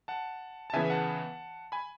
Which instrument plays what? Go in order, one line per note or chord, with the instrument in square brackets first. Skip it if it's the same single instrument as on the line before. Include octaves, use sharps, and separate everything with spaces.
[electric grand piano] F#5 A5
A5
C#3 E3 B3 E5 G#5
F#5 A5
G#5 B5